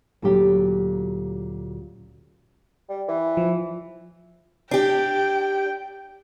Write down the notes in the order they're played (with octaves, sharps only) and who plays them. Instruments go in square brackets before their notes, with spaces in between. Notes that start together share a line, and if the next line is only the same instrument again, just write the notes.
[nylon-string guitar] D2 A#2 F#3 C#4 G4
[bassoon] G3
E3
[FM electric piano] F3
[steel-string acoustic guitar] D4 G4 [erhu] G5